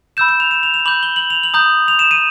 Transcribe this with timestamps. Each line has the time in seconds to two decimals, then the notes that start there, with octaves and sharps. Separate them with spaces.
0.17 B5 E6 G6 E7
0.29 E7
0.40 F7
0.51 E7
0.63 F7
0.74 F7
0.85 B5 D6 G6 F#7
1.03 G7
1.16 F#7
1.30 F7
1.43 F#7
1.54 A#5 D#6 G6
1.88 F7
1.99 E7
2.11 D#7